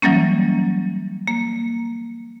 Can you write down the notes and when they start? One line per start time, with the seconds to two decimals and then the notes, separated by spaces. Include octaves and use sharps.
0.02 E3 F#3 G3 A#3 C#4
1.28 A#3